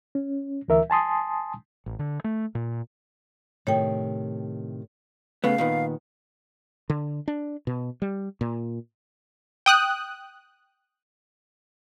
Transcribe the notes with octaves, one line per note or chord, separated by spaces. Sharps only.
C#4
D2 E3 A#4 E5
G#5 A5 C6 D#6
A1
D3
A3
A#2
A2 C3 D#3 C#5 G5
C#3 A3 B3 F5
A#2 D#3 B3
D3
D4
B2
G3
A#2
G5 D#6 F#6